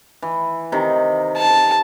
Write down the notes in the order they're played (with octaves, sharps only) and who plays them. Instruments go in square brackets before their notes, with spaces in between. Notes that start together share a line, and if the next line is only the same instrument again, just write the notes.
[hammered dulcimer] E3
C3 D#3
[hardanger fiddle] A5